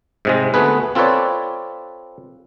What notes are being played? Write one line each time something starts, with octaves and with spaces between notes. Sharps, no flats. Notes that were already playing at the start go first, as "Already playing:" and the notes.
G#2 C3 G#3
D2 A3 B3 G#4 B4
C4 F4 A4 B4 C#5 D5